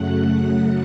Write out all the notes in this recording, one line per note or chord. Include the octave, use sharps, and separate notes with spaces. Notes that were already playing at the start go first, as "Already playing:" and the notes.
Already playing: F#2 C#3 F#3 A3 F#5 F#6